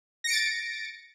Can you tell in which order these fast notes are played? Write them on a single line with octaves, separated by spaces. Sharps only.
A#6 C#7 D7 A6